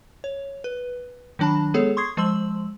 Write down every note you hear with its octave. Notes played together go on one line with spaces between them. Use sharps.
C#5
B4
D#3 F#3 D4 A5 B5
G#3 B3 G#4 A4 C#5
C6 C#6 D#6 G#6 C7
F3 G#3 C5 C6 E6 F#7